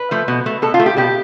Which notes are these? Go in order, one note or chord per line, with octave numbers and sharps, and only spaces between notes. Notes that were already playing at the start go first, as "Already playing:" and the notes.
Already playing: B4
F3 A3
B2
A3
B2 A4
F4
A3
G4
B2 G4